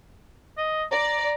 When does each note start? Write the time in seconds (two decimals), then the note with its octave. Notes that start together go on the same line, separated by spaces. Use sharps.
0.58 D#5
0.92 D5 A#5